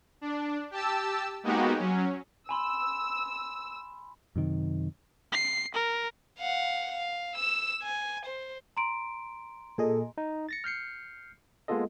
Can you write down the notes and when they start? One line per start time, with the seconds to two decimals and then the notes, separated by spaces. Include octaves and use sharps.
0.21 D4
0.71 G4 A5 E6
1.43 G#3 A#3 B3 D#4 F#4 G4
1.76 F#3 C#4
2.49 G#5 B5 C6 E6
4.36 F#2 C3 D#3
5.32 C7
5.74 A#4
6.39 F5 F#5
6.92 F5
7.35 E6 E7
7.82 G#5
8.25 C5
8.77 A#5 C6 D7
9.78 A#2 G#4 A4 D#5
10.18 D#4
10.49 A6 A#6 C#7
10.64 F6 G6 C7 C#7
11.68 G#3 A#3 B3 F4 A4 D#5